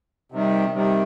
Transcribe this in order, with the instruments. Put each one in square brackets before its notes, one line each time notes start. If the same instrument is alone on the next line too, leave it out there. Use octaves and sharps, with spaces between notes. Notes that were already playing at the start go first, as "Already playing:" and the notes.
[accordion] C3 D#3 G3
C3 D#3 G3